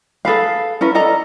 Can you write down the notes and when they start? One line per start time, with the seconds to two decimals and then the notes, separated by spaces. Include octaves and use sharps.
0.25 G#4 A4 B4 F5
0.81 C#4 E4 A#4 B4
0.95 A4 D5 D#5 A#5